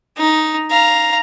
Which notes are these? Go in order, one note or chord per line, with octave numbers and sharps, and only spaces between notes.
D#4
F5 A#5